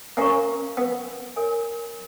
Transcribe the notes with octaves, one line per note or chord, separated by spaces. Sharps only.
A#3 C#4 A#4 F5 A#5 C#6
B3
A#4 C#5 G#5